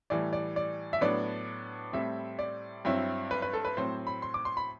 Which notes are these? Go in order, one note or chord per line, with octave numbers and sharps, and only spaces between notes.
A2 E3 G3 D5
D5
D5
E5
A2 F#3 B3 D4 D5
A2 G3 C4 E4 E5
D5
G2 F#3 C4 E4
B4
B4
A4
B4
A2 F#3 C4 C5
B5
C6
D6
C6
B5